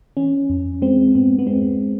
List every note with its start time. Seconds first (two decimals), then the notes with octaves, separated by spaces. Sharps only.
0.17 E3 C#4
0.49 F2
0.82 G#3 C4
1.15 G#2 B3
1.39 B3
1.47 G#3 C4